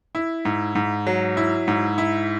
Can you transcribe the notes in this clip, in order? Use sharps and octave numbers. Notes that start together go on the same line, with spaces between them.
E4
G#2
G#2
F#3
E4
G#2
E4